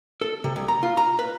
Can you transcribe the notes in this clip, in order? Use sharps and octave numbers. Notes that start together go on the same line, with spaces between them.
A4
C3
C2
A#5
F4
A#5
B4